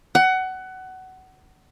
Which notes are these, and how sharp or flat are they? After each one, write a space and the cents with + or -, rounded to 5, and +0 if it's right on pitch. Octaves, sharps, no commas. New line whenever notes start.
F#5 +20